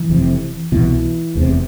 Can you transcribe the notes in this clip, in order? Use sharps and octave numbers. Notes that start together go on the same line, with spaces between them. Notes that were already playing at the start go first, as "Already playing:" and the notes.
Already playing: E3
F1 F2 C3
C2 B2 E3
F1 E2 C3